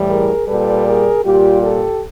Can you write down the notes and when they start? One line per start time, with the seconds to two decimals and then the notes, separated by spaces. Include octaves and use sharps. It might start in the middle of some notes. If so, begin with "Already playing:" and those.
Already playing: A2 E3 G3
0.09 G#4 A#4
0.47 A#2 G3 A4 B4
0.86 G#4 A#4
1.24 A#2 G3 F4 G4
1.62 G4 A4